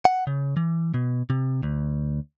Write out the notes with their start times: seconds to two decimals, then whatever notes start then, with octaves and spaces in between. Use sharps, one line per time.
0.05 F#5
0.27 C#3
0.57 E3
0.94 B2
1.30 C3
1.63 D2